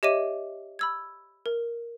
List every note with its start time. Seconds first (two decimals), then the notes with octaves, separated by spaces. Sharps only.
0.03 G4 C#5 D#5 E5 D6 D#7
0.79 B5 E6 G#6
1.46 A#4